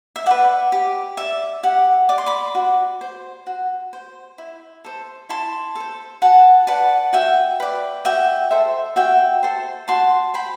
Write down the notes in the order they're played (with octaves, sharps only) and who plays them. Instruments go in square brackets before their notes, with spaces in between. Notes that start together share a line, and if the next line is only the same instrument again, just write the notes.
[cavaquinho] E5
B4 D5 F#5
G4
D5 E5
G4 F#5
D5 D6
C6
B5 D6
F#4
C5
F#4
C5
E4
A4 C5
E4 A5 C6
A4 C5
F#4 F#5 A5
B4 D5 F#5 A5
F#4 E5 G5
B4 D5
F#4 E5 G5
A4 C5 E5
F#4 E5 G5
A4 C5
F#4 A5 C6
C5 G5 B5